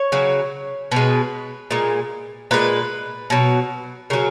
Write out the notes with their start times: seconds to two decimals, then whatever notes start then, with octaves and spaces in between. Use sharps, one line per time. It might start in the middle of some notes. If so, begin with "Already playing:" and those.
Already playing: C#5
0.12 C#3 F#3
0.92 B2 G#3 B4
1.71 A#2 G#3
2.51 A#2 G#3 B4
3.30 B2 F#3
4.10 C#3 F#3 A#4